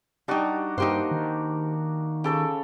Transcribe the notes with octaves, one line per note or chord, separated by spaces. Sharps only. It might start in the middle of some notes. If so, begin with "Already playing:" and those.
G3 D4 D#4 F#4 G4
G2 A#3 D#4 G4 C5
D#3
C#3 G4 A4 C#5